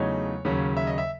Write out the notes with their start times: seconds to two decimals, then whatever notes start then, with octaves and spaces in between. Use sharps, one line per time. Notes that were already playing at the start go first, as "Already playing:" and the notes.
Already playing: E2 C#3 F#3 A3 D#4 C#5
0.45 D#2 C#3 F#3 C#4
0.77 E5
0.87 D#5
0.98 E5